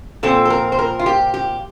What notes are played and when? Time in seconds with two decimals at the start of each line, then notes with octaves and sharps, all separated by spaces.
0.23 A#2 F3 C4 A4
0.45 A4
0.50 A#4
0.72 C5
0.79 A#4
0.99 F4
1.06 G4
1.34 G4